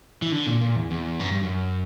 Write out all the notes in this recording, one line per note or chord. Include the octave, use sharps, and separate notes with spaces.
E3
D3
A#2
A#2
E2
E2
F#2
G2
F#2